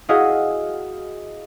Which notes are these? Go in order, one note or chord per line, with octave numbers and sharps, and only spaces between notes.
E4 F#4 G#4 D#5 F5